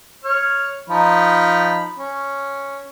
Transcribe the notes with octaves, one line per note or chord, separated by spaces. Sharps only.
C#5 F6
F3 D#4 B5
C#4